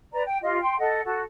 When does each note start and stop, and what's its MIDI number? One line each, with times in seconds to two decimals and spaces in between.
0.13 0.22 71
0.13 0.22 74
0.13 0.22 82
0.24 0.38 79
0.42 0.58 65
0.42 0.58 67
0.42 0.58 75
0.60 0.78 79
0.60 0.78 84
0.78 1.01 69
0.78 1.01 75
0.78 1.01 78
1.04 1.21 66
1.04 1.21 69